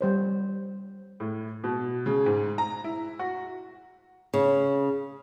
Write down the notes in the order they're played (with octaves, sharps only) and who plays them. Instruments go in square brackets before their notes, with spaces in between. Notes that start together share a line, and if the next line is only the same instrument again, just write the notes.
[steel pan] G3 C5 C#5
[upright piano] A2
B2
C#3
G#2
A#5
E4
F#4
[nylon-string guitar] C#3